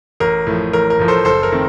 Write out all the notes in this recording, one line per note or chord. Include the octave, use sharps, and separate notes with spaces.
A1 A#4
A2 F3
A1 A#4
A#4
A2 F3
A4 C5
F#1 A4 C5
A#4
D#3 A3 C4